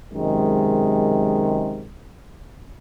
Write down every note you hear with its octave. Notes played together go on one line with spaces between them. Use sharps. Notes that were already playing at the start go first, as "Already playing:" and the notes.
F#2 C3 D#3 G#3